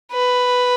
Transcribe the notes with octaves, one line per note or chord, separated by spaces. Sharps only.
B4